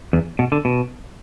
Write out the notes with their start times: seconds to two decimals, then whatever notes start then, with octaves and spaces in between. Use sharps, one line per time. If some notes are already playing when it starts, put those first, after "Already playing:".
0.13 E2
0.39 B2
0.52 D3
0.65 B2